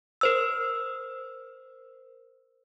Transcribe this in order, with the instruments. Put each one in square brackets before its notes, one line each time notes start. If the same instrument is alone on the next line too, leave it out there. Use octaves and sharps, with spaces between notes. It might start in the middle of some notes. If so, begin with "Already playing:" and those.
[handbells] A#4 C5 E6